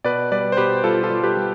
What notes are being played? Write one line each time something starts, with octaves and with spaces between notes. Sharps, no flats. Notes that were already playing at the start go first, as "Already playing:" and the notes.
B2 B4 D5
G3 B4 D5
C5
B2 G4 B4
G3 F4 A4
F4 A4
G3
G4 B4
G3